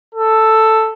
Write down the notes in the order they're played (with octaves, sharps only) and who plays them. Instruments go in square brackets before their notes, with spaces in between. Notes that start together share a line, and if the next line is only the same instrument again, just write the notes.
[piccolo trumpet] A4